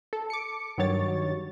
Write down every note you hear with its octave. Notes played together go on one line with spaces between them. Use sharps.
A4
D6 C#7
G2 D#3 F#3 C#5 A6